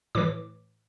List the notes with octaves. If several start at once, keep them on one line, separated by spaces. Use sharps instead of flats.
A2 E3 D6